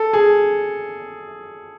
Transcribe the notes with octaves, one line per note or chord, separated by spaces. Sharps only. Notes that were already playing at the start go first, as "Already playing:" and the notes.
Already playing: A4
G#4